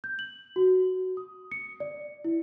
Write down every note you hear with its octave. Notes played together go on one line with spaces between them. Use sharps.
G6
F#7
F#4
D#6
C#7
D5
E4